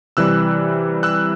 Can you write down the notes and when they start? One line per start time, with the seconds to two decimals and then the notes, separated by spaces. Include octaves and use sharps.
0.17 C3 E3 G3 E6 F#6
1.03 E6 F#6